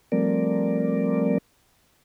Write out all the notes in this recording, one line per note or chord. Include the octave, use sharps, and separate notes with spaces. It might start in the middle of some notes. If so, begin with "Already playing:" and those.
F3 G3 A3 C4 A#4 D5